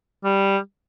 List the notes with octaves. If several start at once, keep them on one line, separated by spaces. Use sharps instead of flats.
G3